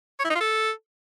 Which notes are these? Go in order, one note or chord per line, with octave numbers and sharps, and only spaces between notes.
C#5
E4
D#4
F4
A4